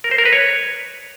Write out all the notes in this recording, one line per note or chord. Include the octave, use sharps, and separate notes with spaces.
A#4
C5
A#4
B4
C#5